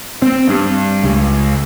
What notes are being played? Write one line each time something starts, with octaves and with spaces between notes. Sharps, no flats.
C4
G2
C#2